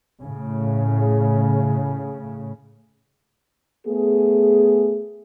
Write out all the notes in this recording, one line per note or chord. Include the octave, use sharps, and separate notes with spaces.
A2 C#3
A3 B3 G#4